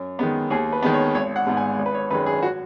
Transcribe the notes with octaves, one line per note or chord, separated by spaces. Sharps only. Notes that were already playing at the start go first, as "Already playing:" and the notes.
Already playing: F#2
D#3 G#3 B3
D#2 G#4
B4
D#3 G#3 B3
C#5
G#1 C#5
F#5
G#2 G#3 B3
G#5
G#1
B4
C#5
F#2 D#3 G#3 B4
G#4
F#4